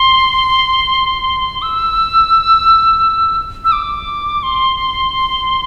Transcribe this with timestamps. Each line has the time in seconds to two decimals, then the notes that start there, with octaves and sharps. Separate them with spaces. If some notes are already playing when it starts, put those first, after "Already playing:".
Already playing: C6
1.62 E6
3.65 E6
3.72 D6
4.43 C6